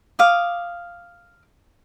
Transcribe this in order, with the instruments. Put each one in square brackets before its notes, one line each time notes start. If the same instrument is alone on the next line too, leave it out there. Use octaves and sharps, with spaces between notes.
[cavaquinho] F5 D6 D#6